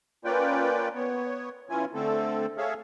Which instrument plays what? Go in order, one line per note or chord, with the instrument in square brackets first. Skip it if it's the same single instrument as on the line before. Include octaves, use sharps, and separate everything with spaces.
[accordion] A#3 C#4 F4 B4 D5 G5
B3 C#5
E3 C#4 E4 F4 G#5
D3 A3 C4 A4
G#4 A4 C#5 E5 F5